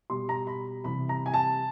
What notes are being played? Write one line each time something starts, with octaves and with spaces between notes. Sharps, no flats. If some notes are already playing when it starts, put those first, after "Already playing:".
B2 G3 C6
A#5
B5
C3 E3 G3 B5
A#5
G#5
A5